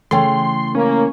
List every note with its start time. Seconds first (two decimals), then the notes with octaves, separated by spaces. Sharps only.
0.11 C#3 E3 A3 A4 C#5 G5 C6
0.75 A#3 C#4